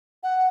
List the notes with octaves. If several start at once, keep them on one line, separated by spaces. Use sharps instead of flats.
F#5